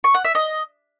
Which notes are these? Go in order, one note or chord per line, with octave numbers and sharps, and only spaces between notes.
C#6
F#5
E5
D#5